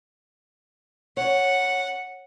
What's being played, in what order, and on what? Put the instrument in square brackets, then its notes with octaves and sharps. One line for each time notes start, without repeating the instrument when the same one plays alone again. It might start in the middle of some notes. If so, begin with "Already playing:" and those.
[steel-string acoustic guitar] C#5 [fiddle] F#5